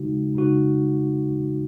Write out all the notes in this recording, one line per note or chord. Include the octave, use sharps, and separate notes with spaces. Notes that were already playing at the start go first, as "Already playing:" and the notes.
Already playing: C#3 G#3 D#4 F#4
C#3 G#3 D#4 F#4